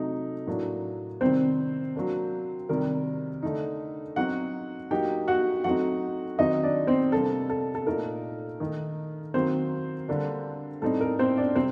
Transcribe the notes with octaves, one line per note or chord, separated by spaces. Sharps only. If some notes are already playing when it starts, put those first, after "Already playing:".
Already playing: C3 F#3 A3 D#4
A2 F#3 A#3 D4
C3 D#3 G3 C4 C5
F#3 A#3 D4
C3 D#3 G3 A#4
D3 A3 D#4
F#3 C4 D#4 F#4 F#5
F#3 A#3 D#4 G4 G5
F#4 F#5
F#3 A3 C4 D#4 F#4 F#5
D#3 F#3 C4 D#4 D#5
D4 D5
C4 C5
C3 G3 A#3 D4 A4
A4
A4
A#2 A3 D#4 A#4
D#3 A3 D#4
D#3 F#3 A#3 C4 C5
D3 G3 A#3 D4
A2 G3 C4 D#4 A4
A#4
C4 C5
D4 D5
C3 G3 C4 C5